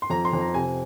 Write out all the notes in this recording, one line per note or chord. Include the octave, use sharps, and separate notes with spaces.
C6
F2 A#5
C6
F2
A#5
C3 G#5